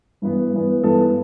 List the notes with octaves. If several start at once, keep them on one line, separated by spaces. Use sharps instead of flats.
G2 E3 B3
G2 E3 B3
G2 E3 B3 A4